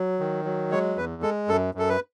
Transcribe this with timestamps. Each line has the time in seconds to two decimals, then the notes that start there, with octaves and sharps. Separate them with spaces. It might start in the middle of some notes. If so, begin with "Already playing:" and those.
Already playing: F#3
0.20 D#3
0.45 F#3
0.71 G#3 C#5
0.96 E2 B4
1.22 G#3 A4
1.48 F#2 A4
1.75 F#2 A4
1.89 B4